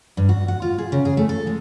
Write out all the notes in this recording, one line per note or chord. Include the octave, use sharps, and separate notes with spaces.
G2
F#4
F#5
F4
G#4
C#3
G#4
A3
A4
G#3